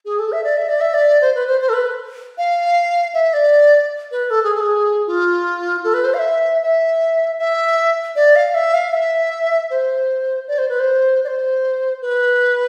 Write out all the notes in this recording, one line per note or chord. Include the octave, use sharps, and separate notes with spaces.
G#4
A4
E5
D5
E5
D5
E5
D5
C5
B4
C5
C5
A4
B4
F5
E5
D5
B4
A4
G#4
A4
G#4
F4
A4
B4
C5
F5
E5
E5
E5
D5
F5
E5
F5
E5
C5
D5
C5
B4
C5
D5
C5
B4